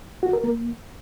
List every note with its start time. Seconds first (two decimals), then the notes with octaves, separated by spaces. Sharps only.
0.23 F#4
0.33 A#4
0.44 A#3